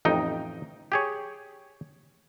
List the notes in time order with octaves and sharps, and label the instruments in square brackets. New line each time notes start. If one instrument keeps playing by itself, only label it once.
[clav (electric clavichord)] A1 F2 D#4 G5
G4 G#4 C#5